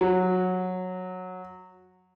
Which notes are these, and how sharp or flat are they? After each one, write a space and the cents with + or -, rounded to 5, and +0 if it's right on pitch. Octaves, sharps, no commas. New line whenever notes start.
F#3 -15